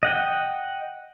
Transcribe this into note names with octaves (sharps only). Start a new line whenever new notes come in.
D#5 F#5 G5